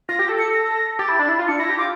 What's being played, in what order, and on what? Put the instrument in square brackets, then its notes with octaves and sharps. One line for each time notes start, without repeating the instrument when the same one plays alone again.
[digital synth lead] F4 [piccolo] A#6
[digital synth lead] G4
A4
[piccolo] C#7
A#6
[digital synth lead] G4 [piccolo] A6
[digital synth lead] E4
D4
E4
F4
[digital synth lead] D4 [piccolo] C#7
[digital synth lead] E4 [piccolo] A#6
[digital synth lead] G4
[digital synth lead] F4 [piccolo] D6